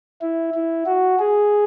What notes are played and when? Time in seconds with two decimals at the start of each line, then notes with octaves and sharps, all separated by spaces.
0.22 E4
0.54 E4
0.86 F#4
1.19 G#4